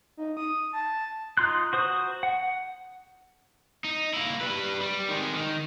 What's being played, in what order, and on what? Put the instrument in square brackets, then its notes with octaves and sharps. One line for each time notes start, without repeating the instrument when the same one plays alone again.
[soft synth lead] D#4
D#6
A5
[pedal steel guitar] D#4 F4 C6 F#6
F#4 C5 D#6
F#5
[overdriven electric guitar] D#4
A#3 E4
G3 B4
G3
D#3 G#3
D#3